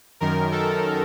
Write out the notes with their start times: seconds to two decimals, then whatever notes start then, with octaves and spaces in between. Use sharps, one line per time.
0.20 F#2 D#3 A#4
0.52 A4